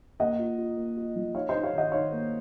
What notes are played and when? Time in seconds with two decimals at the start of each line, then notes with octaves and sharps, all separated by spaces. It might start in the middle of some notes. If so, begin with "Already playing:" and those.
0.20 A#3 D#5 F#5
0.39 F4
0.58 F4
0.77 A#3
0.97 F4
1.16 F3
1.34 D#4 C#5 F5
1.49 D#4 C5 D#5
1.63 C#5 F5
1.73 D#3 D#5 F#5
1.92 D#3 C#5 F5
2.12 A#3